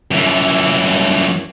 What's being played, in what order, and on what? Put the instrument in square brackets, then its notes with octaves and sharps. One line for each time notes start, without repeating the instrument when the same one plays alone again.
[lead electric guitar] F#2 E3